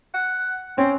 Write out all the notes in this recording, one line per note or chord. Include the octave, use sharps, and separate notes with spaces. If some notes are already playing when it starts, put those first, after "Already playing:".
F#5
C4 C#4